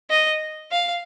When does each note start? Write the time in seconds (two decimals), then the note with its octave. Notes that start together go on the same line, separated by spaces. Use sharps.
0.10 D#5
0.72 F5